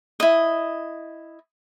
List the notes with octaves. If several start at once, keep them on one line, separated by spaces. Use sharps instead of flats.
E4 D#5